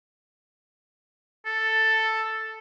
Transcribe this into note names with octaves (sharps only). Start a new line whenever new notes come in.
A4